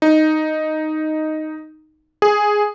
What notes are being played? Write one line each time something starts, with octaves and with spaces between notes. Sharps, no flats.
D#4
G#4